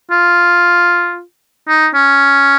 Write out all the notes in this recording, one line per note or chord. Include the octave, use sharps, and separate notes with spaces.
F4
D#4
C#4